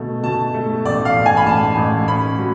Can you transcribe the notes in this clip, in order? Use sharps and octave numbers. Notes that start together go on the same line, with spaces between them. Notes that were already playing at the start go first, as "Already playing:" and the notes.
Already playing: B2 A3
B2 A5
A3
A1 D5
F5
A1
G#5
B5
A1 A5
A1
C#4 B5
F#3